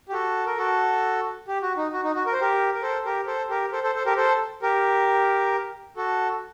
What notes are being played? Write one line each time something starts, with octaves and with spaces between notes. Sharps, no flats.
G4
F#4 A4
A#4
F#4 A4
G4
F#4
D#4
F#4
D#4
F#4
A#4
C5
G4 A#4
A#4
A4 C5
G4 A#4
A4 C5
G4 A#4
A4 C5
A4 C5
A4 C5
G4 A#4
A4 C5
G4 A#4
F#4 A4